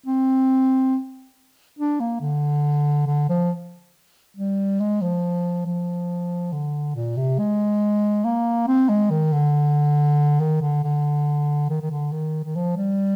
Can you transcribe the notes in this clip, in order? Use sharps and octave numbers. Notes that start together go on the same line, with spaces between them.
C4
D4
A#3
D3
D3
F3
G3
G#3
F3
F3
D3
A#2
C3
G#3
A#3
C4
G#3
D#3
D3
D#3
D3
D3
D#3
D#3
D3
D#3
D#3
F3
G3